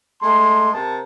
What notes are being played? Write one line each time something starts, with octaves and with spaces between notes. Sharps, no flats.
G#3 A3 A5 C6
C3 A#4 A5